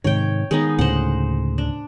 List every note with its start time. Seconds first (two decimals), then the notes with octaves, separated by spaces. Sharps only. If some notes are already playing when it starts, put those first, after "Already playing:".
0.04 G#2 C3 D#3 C#5 G5
0.51 D#3 G#3 B3 D#4
0.79 D2 A2 C#3 C5 F#5
1.58 D4